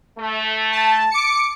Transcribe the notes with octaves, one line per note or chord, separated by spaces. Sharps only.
A3
A5
D6 C#7